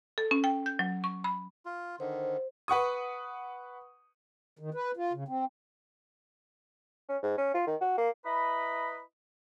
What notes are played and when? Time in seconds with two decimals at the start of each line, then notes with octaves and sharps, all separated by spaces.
0.18 A4
0.31 C#4
0.44 G5
0.66 G6
0.79 F#3
1.04 C#6
1.24 B5
1.66 F4
2.00 D3 D#3 C5
2.68 B4 F#5 C#6 D#6
4.59 D#3
4.74 B4
4.97 F4
5.13 C#3
5.28 C4
7.09 C#4
7.23 G#2
7.38 C#4
7.55 F4
7.67 D#3
7.81 F#4
7.98 A#3
8.25 E4 B4 D#5 A#5 B5